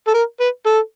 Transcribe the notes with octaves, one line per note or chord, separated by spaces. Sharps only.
A4
A#4
B4
A4